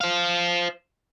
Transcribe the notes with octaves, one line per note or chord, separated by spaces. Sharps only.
C5 F5